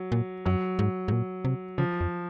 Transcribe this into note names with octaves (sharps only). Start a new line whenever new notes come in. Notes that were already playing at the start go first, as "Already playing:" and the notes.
Already playing: F#3
A#2
F#2 F#3
G#2
G#2
A#2
C3
C#3 F3
F2